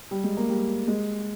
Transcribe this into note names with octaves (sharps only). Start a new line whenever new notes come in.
G3
G#3
A#3
G3
G#3